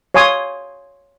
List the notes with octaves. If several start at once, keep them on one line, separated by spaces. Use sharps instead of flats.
C#5 F5 G#5 C6 D#6